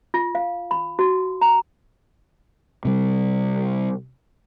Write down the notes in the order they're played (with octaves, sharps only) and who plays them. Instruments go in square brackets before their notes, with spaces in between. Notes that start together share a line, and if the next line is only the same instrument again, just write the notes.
[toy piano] F4
F5
B5
F#4
A#5
[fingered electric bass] C3 G3